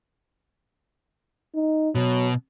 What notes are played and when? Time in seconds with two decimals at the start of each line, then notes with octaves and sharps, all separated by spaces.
1.55 D#4
1.95 B2 F#3